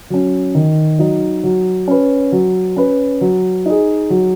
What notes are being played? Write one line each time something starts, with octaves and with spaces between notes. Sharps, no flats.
F#3 C#4
D#3
F#3 D#4
F#3
C#4 B4
F#3
C#4 B4
F#3
D#4 G#4
F#3